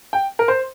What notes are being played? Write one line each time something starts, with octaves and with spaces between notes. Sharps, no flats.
G5
A#4
C5